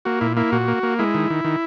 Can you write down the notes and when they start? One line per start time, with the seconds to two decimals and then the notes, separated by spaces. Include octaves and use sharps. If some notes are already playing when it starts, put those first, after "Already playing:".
0.05 A#3 F#4
0.21 A#2 E4
0.37 A#3 E4
0.52 A#2 F#4
0.68 A#3
0.83 A#3
0.99 G#3 E4
1.15 D#3
1.30 D#3
1.45 D#3